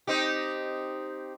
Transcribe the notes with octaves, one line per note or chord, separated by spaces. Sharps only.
C4 D#4 G4